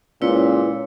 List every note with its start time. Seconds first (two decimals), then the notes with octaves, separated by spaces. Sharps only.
0.22 C#2 A#2 E4 B4 C#5